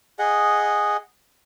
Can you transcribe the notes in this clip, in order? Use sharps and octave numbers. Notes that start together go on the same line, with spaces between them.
G#4 D#5 F#5